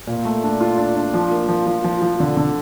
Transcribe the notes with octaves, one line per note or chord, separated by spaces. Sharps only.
A#2
A3
D4
F4
D4
D4
F3
A#3
F3
F3
F3
F3
D3
D3